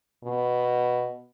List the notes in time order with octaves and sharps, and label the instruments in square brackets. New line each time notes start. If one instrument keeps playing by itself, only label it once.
[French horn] B2